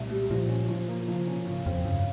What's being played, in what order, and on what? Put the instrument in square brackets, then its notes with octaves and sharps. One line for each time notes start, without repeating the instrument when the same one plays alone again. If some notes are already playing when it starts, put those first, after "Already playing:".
Already playing: [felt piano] C2 [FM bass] A#2
[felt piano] G3
[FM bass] A#2 [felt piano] F3
[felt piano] C#4
F3
A#3
F3
[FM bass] C#3
[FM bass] C3 [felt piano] C#4
[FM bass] A#2
[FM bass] G#2 [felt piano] C#3
[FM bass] F2 [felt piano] C4
[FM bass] G2 [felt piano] C#3